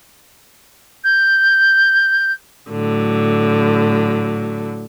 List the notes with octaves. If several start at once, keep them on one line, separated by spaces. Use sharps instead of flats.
G6
A2 D3 F#3